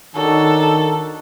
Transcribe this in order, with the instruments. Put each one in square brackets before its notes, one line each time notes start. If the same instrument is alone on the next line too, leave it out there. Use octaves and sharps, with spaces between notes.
[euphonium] D#3 [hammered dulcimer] F#3 D4 D#4 [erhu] A4